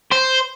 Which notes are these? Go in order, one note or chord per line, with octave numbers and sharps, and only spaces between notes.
C5